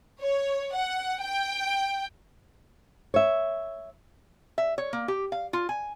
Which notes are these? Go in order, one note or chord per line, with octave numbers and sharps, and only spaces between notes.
C#5
F#5
G5
C#5 E5
E5
C#5
A#3
G4
F5
F4
G#5